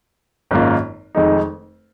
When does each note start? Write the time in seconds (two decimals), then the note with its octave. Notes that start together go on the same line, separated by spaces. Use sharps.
0.51 G#1 F#2 D#3 A#3 F4
1.15 F1 F2 D#3 G#3 D#4